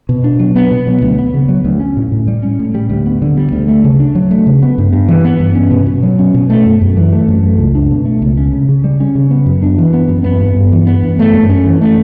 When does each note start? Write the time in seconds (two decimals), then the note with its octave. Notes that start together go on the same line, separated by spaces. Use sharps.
0.09 B2
0.24 D4
0.39 F#3
0.56 B3
0.72 B2
0.87 F#3
1.02 D2
1.19 B3
1.34 C#3
1.49 F#3
1.65 D2
1.80 C#4
1.97 A2
2.12 A2
2.28 G3
2.43 C#4
2.59 A2
2.75 G3
2.90 D2
3.06 B3
3.22 D3
3.37 G3
3.52 D2
3.68 A3
3.84 C#3
4.00 D4
4.15 F#3
4.31 A3
4.47 C#3
4.63 B3
4.78 G2
4.93 G2
5.08 E3
5.24 B3
5.40 G2
5.55 C#4
5.71 B2
5.86 B2
6.03 F#3
6.19 C#4
6.34 B2
6.50 A3
6.66 F#2
6.81 F#2
6.97 E3
7.13 A3
7.28 F#2
7.43 A3
7.59 C#2
7.75 D4
7.90 B2
8.05 A3
8.22 C#2
8.38 C#4
8.53 C#3
8.69 C#3
8.84 G3
9.00 C#4
9.15 C#3
9.31 B3
9.46 F#2
9.62 D4
9.78 E3
9.93 B3
10.09 F#2
10.24 B3
10.41 G2
10.56 G2
10.72 E3
10.87 B3
11.03 G2
11.19 A3
11.34 F#2
11.49 C#4
11.66 E3
11.81 A3